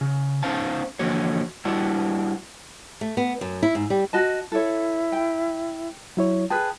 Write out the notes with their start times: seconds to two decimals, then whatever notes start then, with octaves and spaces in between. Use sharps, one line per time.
0.01 C#3
0.43 B3 C#4 D#4 C5 F5 A5
0.99 D3 E3 F3 A#3 F#4 C#5
1.65 G3 D4 E4 F#4
3.01 A3
3.17 B3
3.41 F#2
3.63 E4
3.75 G#2
3.90 G3
4.13 F#4 D#5 A5
4.52 E4 A4 C#5
5.12 G5
6.17 F#3 E4 C#5
6.50 G#4 B4 G5 A5